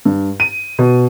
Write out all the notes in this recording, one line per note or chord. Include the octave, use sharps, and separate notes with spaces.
G2
D#7
B2